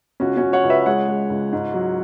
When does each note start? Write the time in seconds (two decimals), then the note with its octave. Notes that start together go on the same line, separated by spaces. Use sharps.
0.20 C#2 C#4 F#4
0.37 C#4 F#4
0.43 C#2
0.53 C#5 F#5
0.64 C#2
0.70 B4 E5
0.86 G#3 C#5 F#5
1.08 G#3
1.30 C#2
1.53 G#2
1.74 F#3